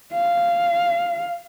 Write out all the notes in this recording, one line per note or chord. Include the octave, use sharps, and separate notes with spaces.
F5